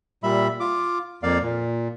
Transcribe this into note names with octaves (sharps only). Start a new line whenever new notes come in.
A#2 G3 E5 B5
F4 D6
F2 A#3 D5 F5
A#2